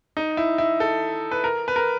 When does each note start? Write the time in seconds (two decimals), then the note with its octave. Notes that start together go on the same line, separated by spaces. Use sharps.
0.17 D#4
0.37 E4
0.58 E4
0.80 A4
1.31 B4
1.44 A#4
1.68 B4
1.76 A#4